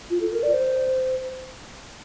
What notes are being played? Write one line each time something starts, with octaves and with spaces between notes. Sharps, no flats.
F4
A4
A#4
D5
C5